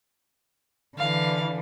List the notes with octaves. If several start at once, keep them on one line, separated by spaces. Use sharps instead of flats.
D3 E3 F5